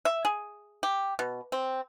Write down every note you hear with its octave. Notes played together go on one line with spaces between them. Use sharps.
E5
G#4
G4
B2
C4